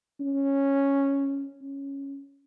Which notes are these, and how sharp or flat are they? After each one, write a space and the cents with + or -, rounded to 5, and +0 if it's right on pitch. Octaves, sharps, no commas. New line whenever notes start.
C#4 -5
C#4 -5